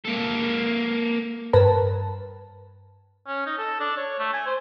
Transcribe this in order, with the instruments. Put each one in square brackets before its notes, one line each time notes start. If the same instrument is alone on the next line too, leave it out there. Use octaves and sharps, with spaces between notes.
[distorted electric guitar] A#3 A4
[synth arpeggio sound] G2 A#4 B4 A5
[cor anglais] C#4
D#4
A4
D4
C#5
A3
G#5
C5